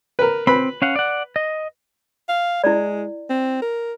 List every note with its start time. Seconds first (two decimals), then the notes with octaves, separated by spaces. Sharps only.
0.19 A#4 B4
0.47 C4 B4 B5
0.82 C#4 F5 F#5
0.96 D5 F#5
1.36 D#5
2.29 F5
2.64 G#3 E4 D5
3.29 C4
3.62 A#4